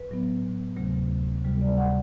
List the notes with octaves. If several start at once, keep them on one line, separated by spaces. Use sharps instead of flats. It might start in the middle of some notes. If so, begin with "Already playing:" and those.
Already playing: B4
A2 F#3 B3
D2 C3 F#3 A3
D2 C3 G3
D5
F#5